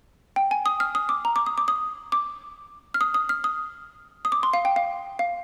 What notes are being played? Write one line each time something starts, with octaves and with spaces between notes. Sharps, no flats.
G5
G#5
D#6
F6
D#6
D6
A#5
D6
D#6
D6
D#6
D6
F6
D#6
D#6
F6
D#6
D#6
D6
C6
F5
G5
F5
F5